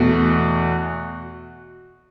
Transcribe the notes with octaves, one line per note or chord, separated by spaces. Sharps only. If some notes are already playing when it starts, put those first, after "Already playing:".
Already playing: E2 B2 A3 F#4